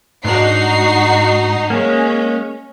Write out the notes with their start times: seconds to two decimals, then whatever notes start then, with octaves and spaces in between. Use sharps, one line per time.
0.24 G#2 D4 D#4 F#4 C7
1.70 G#3 A#3 C#4